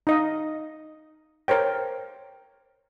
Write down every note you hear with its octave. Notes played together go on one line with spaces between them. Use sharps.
D#4 D#5 F5
A#4 C5 C#5 G5